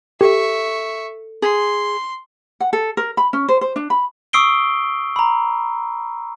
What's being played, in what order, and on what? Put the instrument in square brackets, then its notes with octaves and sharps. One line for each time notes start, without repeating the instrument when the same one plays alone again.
[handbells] G4 [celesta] A4 [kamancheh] E5 C#6
[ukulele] G#4 [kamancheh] C6
[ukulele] F#5
A4
A#4
B5
C#4
C5
C5
D4
B5
[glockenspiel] C#6 D#6 E6 C7 D7 G7
A#5 B5